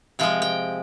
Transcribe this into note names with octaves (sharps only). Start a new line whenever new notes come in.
C3 F3 G#3 G5
G5